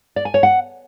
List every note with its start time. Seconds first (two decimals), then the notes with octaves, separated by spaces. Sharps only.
0.16 D5
0.25 G#5
0.34 C#5
0.43 F#5